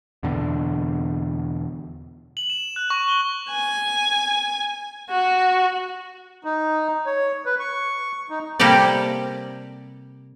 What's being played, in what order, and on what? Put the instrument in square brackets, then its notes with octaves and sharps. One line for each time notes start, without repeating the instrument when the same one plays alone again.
[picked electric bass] E2 B2 D3
[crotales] F#7
E7
F#6
C#6
G7
[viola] G#5
F#4
[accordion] D#4
C#5
B4
C#6
D#4
[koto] C3 G3 A#3 G4 A4 D5